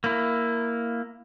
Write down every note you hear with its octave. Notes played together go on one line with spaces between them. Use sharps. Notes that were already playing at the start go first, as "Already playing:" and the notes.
A#3 E4